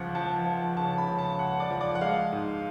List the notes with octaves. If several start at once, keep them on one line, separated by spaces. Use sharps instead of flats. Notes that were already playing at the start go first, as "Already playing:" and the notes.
Already playing: C#2 F3 F#5
F3 A5
F3
C#3 A5
B5
C#3
A5
C#2 F#5
D5
F3
D5
F#5
G#3 F5
G#2